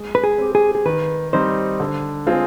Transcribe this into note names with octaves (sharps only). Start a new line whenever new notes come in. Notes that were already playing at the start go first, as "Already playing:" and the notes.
Already playing: G#3
B4
G#4
C4 G4
G#4
G#4
D#3 B4
G3 C4 D#4 C5
D3
G#3 C4 F4 G#4